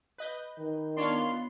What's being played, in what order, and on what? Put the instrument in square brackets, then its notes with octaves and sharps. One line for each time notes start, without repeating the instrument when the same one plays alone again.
[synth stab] B4 D#5 G6
[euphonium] D#3
[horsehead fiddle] B3 F4 [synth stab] D4 C#5 F5 [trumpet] C6